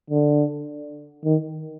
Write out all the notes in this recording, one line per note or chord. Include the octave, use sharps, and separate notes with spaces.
D3
D#3